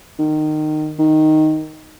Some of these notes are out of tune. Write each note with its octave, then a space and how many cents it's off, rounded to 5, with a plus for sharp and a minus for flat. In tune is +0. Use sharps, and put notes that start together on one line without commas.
D#3 -20
D#3 +0